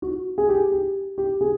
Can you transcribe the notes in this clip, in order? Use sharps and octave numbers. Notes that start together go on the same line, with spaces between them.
F#4
G#4
G4
G4
G4
G#4